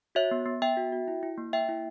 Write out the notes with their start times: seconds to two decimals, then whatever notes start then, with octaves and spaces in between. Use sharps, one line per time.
0.15 F#4 C#5 E5
0.31 B3
0.46 B3
0.62 B3 E5 G5
0.77 F#4
0.92 F#4
1.08 E4
1.23 E4
1.38 A#3
1.53 A#3 E5 G5
1.69 E4